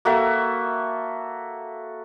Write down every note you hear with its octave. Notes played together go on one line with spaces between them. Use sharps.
A#3 F#4 A4 E5